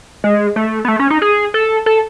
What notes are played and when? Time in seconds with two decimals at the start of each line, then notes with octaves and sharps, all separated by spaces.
0.24 G#3
0.56 A3
0.85 B3
0.88 A3
0.99 C#4
1.10 D#4
1.22 G#4
1.54 A4
1.86 A4